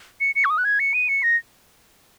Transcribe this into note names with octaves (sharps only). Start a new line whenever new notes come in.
C#7
C#7
C#6
D#6
F#6
G#6
C#7
D#7
C#7
A#6